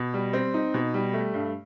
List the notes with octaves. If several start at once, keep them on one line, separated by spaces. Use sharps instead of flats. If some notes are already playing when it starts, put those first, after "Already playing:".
Already playing: B2
G3
C4
D#4
B2
G3
A3
G2